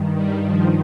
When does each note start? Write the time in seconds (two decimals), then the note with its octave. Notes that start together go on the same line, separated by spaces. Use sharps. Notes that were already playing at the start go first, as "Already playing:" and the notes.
Already playing: G2 D#3
0.16 G3
0.45 F3